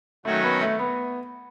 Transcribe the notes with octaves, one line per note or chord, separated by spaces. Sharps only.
D#3 F#3 A3 C#4 F#4 C#5
B3
A3
B3